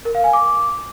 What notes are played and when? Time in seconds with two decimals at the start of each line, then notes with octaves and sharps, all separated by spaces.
0.05 A#4
0.15 F5
0.24 G#5
0.33 D6